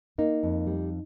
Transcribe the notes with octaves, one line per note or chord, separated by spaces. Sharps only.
A#3 D#4
F2
G3